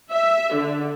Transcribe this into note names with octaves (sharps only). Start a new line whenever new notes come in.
E5
D3